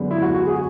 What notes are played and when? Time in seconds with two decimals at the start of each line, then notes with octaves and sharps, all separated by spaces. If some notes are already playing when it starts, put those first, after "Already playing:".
Already playing: F#2 D3 G#3 B3 D4
0.11 E4
0.22 F#4
0.34 F#4
0.47 G#4